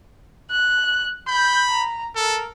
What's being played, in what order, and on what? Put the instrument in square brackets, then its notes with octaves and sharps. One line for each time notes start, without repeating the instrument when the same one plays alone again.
[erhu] F#6
[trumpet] B5 [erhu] G6
[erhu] A#5
[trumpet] A4 [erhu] A#4